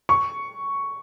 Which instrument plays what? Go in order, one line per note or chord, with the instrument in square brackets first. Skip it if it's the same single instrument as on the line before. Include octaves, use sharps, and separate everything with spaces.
[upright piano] C#6